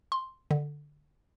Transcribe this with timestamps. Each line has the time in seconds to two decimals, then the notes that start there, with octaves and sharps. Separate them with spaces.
0.12 C6
0.51 D3